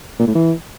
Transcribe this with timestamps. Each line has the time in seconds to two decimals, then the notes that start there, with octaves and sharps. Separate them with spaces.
0.19 A#2
0.27 A2
0.35 E3